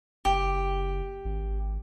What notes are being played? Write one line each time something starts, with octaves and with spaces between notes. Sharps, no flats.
F#1 G4
G#1